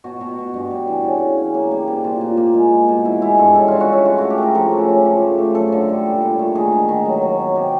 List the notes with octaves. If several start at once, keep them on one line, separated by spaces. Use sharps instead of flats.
B2 F#4
B2
B2
G2
G3
E3
C#3
C#3
C#3
A#3
G3
C3
A#2 F4
A#2
A#3
G#3
G#3
B2
E3 E4
G#3 E4
G2 A4
C#3 E4
C#3 F4
F#4
C#3 E4
A3 F4
A3 F#4
G4
A3 A#4
F3 A4
C#3
C#3
F3
A3
A3
F#2 A4
D3
G3
A#2
A#2
A3
D#3 G#4
G#3
D#3
F#3
F#3
B2
C3 G4